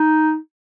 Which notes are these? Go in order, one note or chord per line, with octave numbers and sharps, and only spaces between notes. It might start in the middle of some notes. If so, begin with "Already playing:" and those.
Already playing: D#4